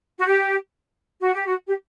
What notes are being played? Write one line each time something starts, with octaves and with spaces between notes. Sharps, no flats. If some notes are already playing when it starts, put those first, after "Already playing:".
F#4
G4
F#4
G4
F#4
G4